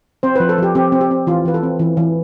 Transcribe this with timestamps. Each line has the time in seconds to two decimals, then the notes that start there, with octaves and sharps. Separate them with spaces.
0.23 C4 C5
0.36 F3 B4
0.49 A4
0.58 F3 G4
0.75 C4 G4
0.92 C4
1.01 G4
1.11 C4
1.27 E3 F4
1.45 E3 B4
1.54 A4
1.63 C4
1.79 E3
1.97 E3